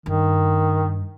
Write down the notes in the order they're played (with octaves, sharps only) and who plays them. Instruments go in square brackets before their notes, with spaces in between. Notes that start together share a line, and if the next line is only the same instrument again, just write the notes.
[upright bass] G2 [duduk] D#3